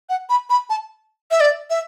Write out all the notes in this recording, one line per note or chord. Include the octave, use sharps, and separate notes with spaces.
F#5
B5
B5
A5
E5
D5
E5